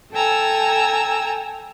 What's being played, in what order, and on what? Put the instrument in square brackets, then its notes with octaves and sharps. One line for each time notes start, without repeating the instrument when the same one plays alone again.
[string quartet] A4 G5 G#5 A#5 E6